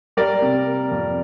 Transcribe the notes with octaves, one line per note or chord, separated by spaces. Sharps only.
G3 A#4 D5
C3
A#3
F2